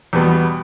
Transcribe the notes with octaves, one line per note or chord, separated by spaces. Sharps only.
E2 B2 G3 B3